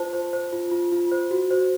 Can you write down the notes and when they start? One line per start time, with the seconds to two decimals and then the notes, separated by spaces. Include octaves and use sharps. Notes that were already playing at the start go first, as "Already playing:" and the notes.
Already playing: F4 C5 A5
0.13 C5
0.33 C5
0.53 F4
0.71 F4
0.92 F4
1.12 C5
1.31 F#4
1.51 C5